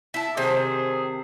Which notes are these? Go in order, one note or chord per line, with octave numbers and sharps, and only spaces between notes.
E4 A5
C3 D#3 D4 G#4 C5